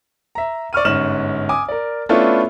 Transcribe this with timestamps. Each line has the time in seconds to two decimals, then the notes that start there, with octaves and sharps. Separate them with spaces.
0.35 E5 A#5
0.73 D5 C#6 F6 D#7
0.85 G1 G#2 C#4 F6 E7 F#7
1.49 G#5 D6 D#6
1.69 A#4 D5
2.09 A3 B3 C#4 D4 E4 F4